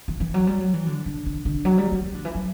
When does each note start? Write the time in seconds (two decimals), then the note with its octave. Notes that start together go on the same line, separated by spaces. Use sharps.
0.08 E3
0.20 E3
0.34 F#3
0.47 G3
0.60 F#3
0.73 E3
0.86 D3
1.06 D3
1.26 D3
1.45 D3
1.65 F#3
1.78 G3
1.92 F#3
2.05 E3
2.14 D3
2.25 E3
2.35 F#3